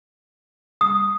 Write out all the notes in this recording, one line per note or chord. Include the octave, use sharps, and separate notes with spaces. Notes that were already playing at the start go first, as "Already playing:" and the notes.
D#6